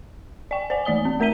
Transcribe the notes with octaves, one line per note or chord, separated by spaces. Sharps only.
D5 G5
C5 D5 G#5
E3 A3 D5 D#6 G7
C4
A3 A#4 A#5 B6 D#7 G7